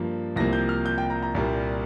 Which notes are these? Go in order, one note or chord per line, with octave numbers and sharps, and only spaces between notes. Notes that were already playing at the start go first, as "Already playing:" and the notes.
Already playing: G2 F3 A#3
C2 C3 F3 A#3 A#6
G6
F6
G6
G5
A#5
A#5
C2 A#2 G3 A#3